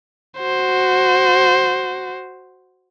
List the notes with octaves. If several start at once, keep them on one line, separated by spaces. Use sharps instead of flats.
F#4 C5